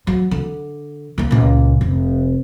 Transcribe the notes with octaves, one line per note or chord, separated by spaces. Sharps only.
F#3
D3
D#3 A#3
C#2 A#2
F1